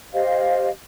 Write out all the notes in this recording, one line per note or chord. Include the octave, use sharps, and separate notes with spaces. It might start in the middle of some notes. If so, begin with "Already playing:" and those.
G4 C5 D#5 F5